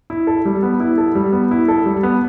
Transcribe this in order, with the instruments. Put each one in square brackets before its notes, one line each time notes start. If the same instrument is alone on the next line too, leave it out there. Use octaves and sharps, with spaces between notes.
[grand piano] E4
A4
G3
B3
E4
A4
G3
B3
E4
A4
G3
B3